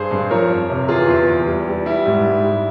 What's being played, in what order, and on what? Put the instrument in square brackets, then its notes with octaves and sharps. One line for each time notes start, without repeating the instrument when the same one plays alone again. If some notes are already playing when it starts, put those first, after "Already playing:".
Already playing: [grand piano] G2 G#4 C5
G2
F3 A#4 C#5
F2
C3
E3 F4 G#4
E2 F4
E2
G3
G3
G3 E4
G#2
G#2
G3